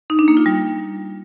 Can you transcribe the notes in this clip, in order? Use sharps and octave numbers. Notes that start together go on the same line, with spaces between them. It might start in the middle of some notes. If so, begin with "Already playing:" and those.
D#4
D4
A#3
F4
G3